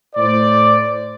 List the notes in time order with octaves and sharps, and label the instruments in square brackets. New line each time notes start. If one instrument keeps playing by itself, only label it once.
[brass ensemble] A2 C5 D5